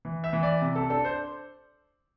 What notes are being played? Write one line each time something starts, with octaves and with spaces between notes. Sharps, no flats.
E3
E5
E3
D5
C3
A4
D4 A4
C5